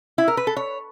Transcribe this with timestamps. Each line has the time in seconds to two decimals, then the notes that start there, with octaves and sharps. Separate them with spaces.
0.18 E4
0.28 A#4
0.37 B4
0.47 A4
0.57 C#5